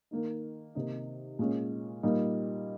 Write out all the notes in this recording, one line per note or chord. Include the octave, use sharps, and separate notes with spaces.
D#3 A#3 D#4
C3 D#3 A#3 D#4
A#2 G#3 C#4
A#2 G3 A#3 D#4